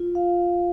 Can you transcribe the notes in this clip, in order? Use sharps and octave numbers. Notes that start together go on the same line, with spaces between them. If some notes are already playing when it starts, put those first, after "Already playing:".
Already playing: F4
F5